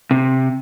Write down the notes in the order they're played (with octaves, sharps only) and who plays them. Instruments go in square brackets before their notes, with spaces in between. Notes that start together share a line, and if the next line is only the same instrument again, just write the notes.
[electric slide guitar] C3